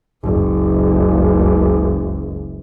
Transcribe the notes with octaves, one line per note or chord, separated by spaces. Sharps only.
F#1 C#2